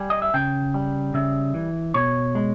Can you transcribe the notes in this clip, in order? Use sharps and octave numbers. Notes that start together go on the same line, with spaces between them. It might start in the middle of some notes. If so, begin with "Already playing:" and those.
Already playing: G3 G#5
D#5
E5
C#3 G5
G3
C#3 E5
E3
B2 C#5
G#3